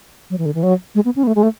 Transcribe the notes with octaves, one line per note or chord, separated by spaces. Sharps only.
F#3
E3
D3
E3
F#3
G#3
B3
C#4
B3
A3
G#3
A3